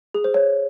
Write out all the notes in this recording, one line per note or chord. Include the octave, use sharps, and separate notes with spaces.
G#4
C5
C#5